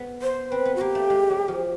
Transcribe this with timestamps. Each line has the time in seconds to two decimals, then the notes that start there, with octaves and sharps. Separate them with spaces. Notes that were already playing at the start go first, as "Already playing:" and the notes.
Already playing: B3
0.22 C5
0.51 C4 B4
0.65 B3
0.76 F#4
0.81 A#3 G4
0.95 A3
1.10 G#3
1.30 F#3
1.48 F3